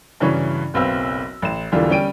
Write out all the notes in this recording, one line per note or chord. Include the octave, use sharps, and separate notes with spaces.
G2 C#3 E3 F#3 C#4
F#1 B1 C4 B4 F5 E6
A1 E7
E1 D3 E3 G3 D4 F4
G3 C#4 G5 D7 D#7